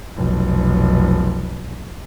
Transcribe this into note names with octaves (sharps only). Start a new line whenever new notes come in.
F1 B1